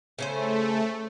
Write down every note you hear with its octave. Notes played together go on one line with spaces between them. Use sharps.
C#3 A3 C#4 C5